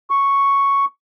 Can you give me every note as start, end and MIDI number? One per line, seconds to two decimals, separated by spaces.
0.10 0.85 85